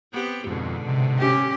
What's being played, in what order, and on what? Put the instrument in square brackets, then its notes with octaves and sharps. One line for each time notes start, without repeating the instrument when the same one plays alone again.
[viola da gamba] B3 C4 G4
[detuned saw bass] F2 [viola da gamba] G#2 B2 D3
[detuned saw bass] C3
[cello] C#4 G4